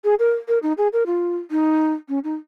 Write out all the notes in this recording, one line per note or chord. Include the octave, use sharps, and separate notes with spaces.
G#4
A#4
A#4
D#4
G#4
A#4
F4
D#4
C#4
D#4